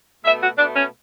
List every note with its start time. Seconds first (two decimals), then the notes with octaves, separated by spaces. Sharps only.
0.25 B2 A3 E5
0.41 F#4
0.58 B2 A3 D4
0.75 C#4